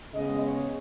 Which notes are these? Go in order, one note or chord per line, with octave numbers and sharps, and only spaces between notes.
C#3 G#3 B3 D#5
C#5